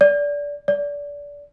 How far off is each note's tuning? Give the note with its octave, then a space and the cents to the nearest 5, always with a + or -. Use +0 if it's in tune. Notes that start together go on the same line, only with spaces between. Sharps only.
D5 -20
D5 -25